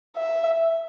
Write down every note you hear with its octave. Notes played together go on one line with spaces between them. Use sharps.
E5